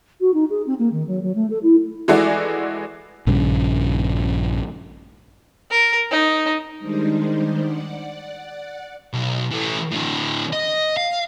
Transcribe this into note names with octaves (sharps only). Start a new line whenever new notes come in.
F#4
D#4
G#4
C4
A#3
D#3
F#3
F#3
A3
A4
E4
E3 G#3 A3 E4 F#4 D5
A#1 G2 C#3
A#4
D#4
D#3 G3 G#3 D4 D#4 C5
D5 F#5
B1
E3 A3
A2 D3
D#5
F5